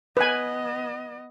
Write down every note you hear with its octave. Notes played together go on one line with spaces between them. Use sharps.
B3 B4 D#5 G#5